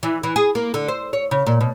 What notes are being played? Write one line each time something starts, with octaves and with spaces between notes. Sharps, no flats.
E3
E3
G#4
A#3
D3
C5
C#5
C#3
A#2
B2